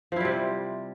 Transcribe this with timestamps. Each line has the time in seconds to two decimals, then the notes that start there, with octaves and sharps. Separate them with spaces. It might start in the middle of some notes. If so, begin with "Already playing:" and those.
0.12 F3
0.16 E4
0.20 G3
0.25 C3